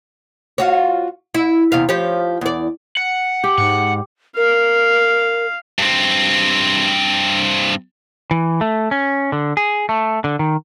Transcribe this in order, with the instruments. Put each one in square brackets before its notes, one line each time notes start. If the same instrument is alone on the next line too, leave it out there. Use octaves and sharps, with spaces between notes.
[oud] F4 F#4 C#5
E4
E2 C3 F5
F3 G4 C#5
E2 D5
[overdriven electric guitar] F#5
[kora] G4
[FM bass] G#2 [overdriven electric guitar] F#5
[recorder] A#4 [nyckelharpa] F5
[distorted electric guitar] G2 C4
[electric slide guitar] E3
A3
C#4
D3
G#4
A3
D3
D#3